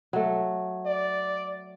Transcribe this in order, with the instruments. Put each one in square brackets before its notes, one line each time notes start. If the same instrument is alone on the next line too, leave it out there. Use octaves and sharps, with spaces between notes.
[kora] F#3 A3
[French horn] D5